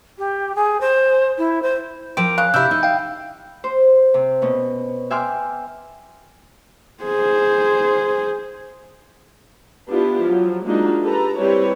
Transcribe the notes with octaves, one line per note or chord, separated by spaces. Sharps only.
G4
G#4
C5
E4
C5
F3 C4 G4 A#4 D7
C#3 F5 F#6
C3 D4 E4 G4 E5 E6 G6
D#4
F5 G5
C5
C3
B2 C#4
E5 G5 G#5 C6 D6 F6
G#4 C5
B3 D4 E4 F4 G4
F3 F#3
G#3 A#3 D4 D#4 F4 F#4
G4 A4 B4 A#5
G3 C4 E4 G4 B4 C#5